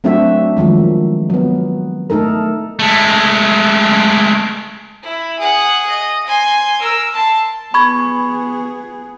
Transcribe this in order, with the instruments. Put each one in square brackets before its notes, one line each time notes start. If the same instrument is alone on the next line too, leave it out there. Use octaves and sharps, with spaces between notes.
[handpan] F#3 A3 C4 D4 F#4 E5
D#3 F3 F#3 G#3
F#3 B3
A3 D#4 A4 A#4
[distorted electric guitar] G#3 A3
[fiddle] E4
G#4 F#5
D#5
G#5 C6
A#4 E6
A5 C6
[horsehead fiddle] B3 G#4 [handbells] B5 C#6 G#6